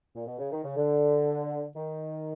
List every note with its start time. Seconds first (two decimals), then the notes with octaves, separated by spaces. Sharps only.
0.15 A#2
0.27 B2
0.39 C#3
0.52 D#3
0.64 C#3
0.77 D3
1.76 D#3